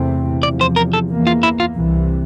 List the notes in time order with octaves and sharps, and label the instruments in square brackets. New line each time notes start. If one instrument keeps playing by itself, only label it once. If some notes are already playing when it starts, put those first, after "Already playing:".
Already playing: [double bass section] E2 C3 E3 A3 C4
[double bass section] E2 C3 F3 [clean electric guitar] D5
[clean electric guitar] C5
A#4
A4
[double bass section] E2 E3 A#3
[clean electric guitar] F4
E4
F4
[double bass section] C2 C3 E3